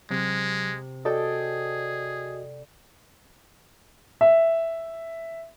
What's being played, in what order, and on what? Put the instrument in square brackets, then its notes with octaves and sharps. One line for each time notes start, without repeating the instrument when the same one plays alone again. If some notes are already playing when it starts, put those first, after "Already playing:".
[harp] C3 [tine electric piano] F#3 [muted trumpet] G#3
[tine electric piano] F#4 D#5 D#6 [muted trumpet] G#4 [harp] A4 D5 G5
[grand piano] E5